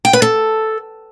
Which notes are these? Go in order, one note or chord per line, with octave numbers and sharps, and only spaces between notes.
G5
B4
A4